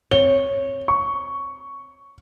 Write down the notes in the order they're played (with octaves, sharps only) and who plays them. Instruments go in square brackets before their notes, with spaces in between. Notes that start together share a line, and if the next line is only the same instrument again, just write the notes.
[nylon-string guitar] C4 C#5 [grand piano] G7
[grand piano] C#6